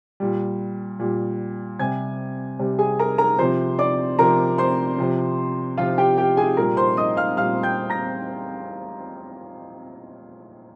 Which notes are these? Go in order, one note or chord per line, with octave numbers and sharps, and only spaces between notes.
A#2 G3
A#2 G3
C3 G3 G#5 G#6
C3 G3
G#4 G#5
A#4 A#5
A#4 A#5
C3 F3 C5 C6
D5 D6
C3 F3 A#4 A#5
C5 C6
C3 F3
C3 F3 F4 F5
G4 G5
G4 G5
G#4 G#5
A#2 G3 A#4 A#5
C5 C6
D#5 D#6
F5 F6
A#2 G3 F5 F6
G5 G6
A#5 A#6